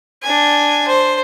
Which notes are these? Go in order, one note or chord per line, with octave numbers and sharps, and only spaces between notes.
D4 G#5
C5